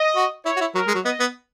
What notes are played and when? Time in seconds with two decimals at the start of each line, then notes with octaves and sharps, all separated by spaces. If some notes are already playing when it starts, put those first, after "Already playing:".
Already playing: D#5
0.15 F#4
0.45 E4 C#5
0.56 F#4
0.60 E4
0.75 F#3 A#4
0.87 G#3
0.94 F#3
1.04 B3 D#5
1.20 B3